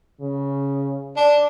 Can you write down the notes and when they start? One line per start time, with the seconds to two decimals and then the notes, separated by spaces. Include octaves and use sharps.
0.21 C#3
1.17 D4 D5